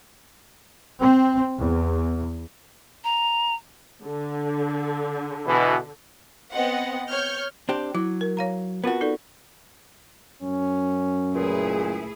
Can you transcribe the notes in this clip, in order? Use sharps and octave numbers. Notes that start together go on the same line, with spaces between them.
C4
E2
A#5
D3
B2 E3
B3 C4 D#5 F#5
C#5 F6 G6
C4 D4 G4
F#3 E4
A#4
C#5 F5 A#5
B3 C4 F4 F#4 A#4
D#4 A4 D5
F#2 C#4
C#2 A#2 A3 E4 G#4